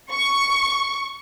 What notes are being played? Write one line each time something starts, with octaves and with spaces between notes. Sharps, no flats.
C#6